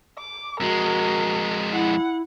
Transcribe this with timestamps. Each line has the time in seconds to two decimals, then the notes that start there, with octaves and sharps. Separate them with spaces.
0.19 D6
0.60 F2 G#3 F#4 A#4
1.72 E4 F#5